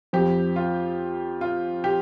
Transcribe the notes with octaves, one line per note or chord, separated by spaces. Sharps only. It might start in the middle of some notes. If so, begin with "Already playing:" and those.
F2 F3 C4 G4
F4
F4
G4